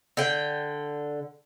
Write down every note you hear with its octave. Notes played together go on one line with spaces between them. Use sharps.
D3 G5